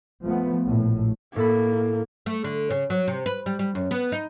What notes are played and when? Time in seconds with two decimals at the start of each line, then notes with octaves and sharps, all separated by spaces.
0.23 F3 A3 B3
0.65 A#1 A2
1.36 A2 A#3 A4 B5
2.26 A3
2.44 D3
2.71 C#3
2.90 F#3
3.08 C3
3.26 B4
3.46 G3
3.59 G3
3.75 F#2
3.91 B3
4.12 D#4